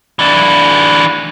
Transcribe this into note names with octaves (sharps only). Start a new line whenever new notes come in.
E3 D4